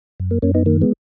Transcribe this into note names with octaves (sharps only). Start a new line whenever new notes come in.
F#2
A#3
F#2 A#3 C#4
B3 D#4
D#3 A#3
G#3 B3